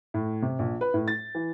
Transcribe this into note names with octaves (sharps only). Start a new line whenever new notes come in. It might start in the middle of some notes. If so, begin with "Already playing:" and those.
A2
C3
A#1
B4
A2
A6
E3